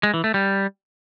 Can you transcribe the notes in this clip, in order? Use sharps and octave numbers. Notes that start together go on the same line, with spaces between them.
G#3
E3
A3
G3